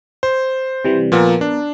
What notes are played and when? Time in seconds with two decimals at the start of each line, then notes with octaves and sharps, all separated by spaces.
0.23 C5
0.85 C3 E3 G3
1.12 A#2 F3 B3 A#4
1.41 D4